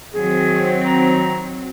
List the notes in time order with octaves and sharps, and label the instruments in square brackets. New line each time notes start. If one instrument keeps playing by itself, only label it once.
[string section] D#3 F#3 C4 [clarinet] G#4
[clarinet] A#5